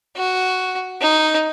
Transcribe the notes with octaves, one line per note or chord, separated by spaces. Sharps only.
F#4
D#4